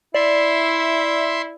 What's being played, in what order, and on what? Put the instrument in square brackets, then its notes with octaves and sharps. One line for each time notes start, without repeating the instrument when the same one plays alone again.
[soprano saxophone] E4 [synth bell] D5 [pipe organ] E5 C6